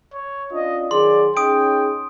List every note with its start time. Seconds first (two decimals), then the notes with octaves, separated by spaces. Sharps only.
0.13 C#5
0.52 C#4 D4 F4 D#5
0.91 D#3 F#3 G#4 D5 C6
1.37 C#4 D#4 G#4 G5 D#6 D7